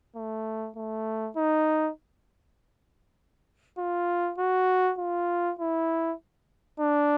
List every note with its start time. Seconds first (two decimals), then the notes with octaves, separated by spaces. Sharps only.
0.16 A3
0.76 A3
1.37 D#4
3.78 F4
4.38 F#4
4.99 F4
5.59 E4
6.79 D4